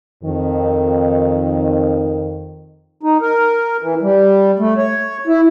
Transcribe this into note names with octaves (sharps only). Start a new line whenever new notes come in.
F2 D#3
D#4
A#4
E3
G3
A3
C#5
E4